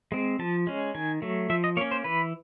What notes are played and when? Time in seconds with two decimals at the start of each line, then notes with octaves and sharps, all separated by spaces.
0.12 G#3 C4
0.39 F3 A5
0.67 G#3 C#4
0.95 D#3 G#5
1.22 F#3 A3
1.50 F3 E5
1.64 D#5
1.77 A#3 C#5
1.81 C#4
1.91 C5
2.04 E3 B4